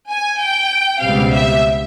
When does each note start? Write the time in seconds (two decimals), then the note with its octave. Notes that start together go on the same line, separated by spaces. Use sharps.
0.10 G#5
0.40 G5
1.01 C#2 B2 G3 C4 F5
1.32 E5